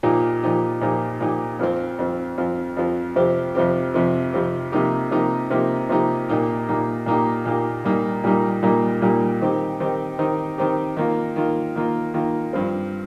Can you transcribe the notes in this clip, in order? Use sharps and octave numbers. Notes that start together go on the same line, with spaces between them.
A#2 F3 D#4 G4
A#2 F3 D#4 G4
A#2 F3 D#4 G4
A#2 F3 D#4 G4
F2 F3 C4
F2 F3 C4
F2 F3 C4
F2 F3 C4
F2 C3 F3 C4 G4
F2 C3 F3 C4 G4
F2 C3 F3 C4 G4
F2 C3 F3 C4 G4
C3 F3 A#3 D#4 G4
C3 F3 A#3 D#4 G4
C3 F3 A#3 D#4 G4
C3 F3 A#3 D#4 G4
A#2 A#3 D#4 G4
A#2 A#3 D#4 G4
A#2 A#3 D#4 G4
A#2 A#3 D#4 G4
A#2 G3 A#3 D#4
A#2 G3 A#3 D#4
A#2 G3 A#3 D#4
A#2 G3 A#3 D#4
D#3 C4 D#4 G4
D#3 C4 D#4 G4
D#3 C4 D#4 G4
D#3 C4 D#4 G4
D#3 A#3 F4
D#3 A#3 F4
D#3 A#3 F4
D#3 A#3 F4
G2 F3 C4